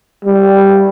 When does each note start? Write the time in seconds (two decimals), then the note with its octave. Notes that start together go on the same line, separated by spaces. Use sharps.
0.25 G3